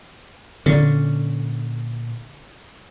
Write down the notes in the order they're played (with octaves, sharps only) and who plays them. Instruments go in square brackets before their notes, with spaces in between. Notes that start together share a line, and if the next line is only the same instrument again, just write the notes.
[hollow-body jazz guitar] A#2 C#4 [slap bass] D3